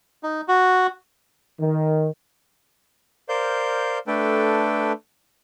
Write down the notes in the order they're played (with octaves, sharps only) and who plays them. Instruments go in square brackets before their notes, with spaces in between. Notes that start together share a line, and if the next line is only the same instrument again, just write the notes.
[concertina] D#4
F#4
[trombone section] D#3
[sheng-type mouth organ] A#4 C5 D5 F5 G6
A3 D4 A4 B4 G5